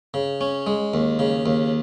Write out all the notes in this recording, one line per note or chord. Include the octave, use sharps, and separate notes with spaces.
C#3
C#4
G#3
D#2
C#3
D#2